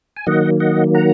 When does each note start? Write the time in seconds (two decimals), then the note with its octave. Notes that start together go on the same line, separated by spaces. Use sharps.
0.17 G#5
0.27 D#3 F#3 A#3 D#5 F#5
0.60 D#5 F#5
0.94 F#5 A#5